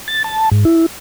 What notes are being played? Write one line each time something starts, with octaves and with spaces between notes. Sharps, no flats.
A6
A5
G#2
E4